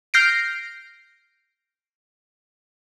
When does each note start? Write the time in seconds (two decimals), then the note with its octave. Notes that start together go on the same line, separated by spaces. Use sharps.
0.14 F6 G6 A#6 C7 D7